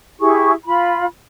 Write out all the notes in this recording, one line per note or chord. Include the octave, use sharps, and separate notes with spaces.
E4 G4 G#4 C#6
F4 B5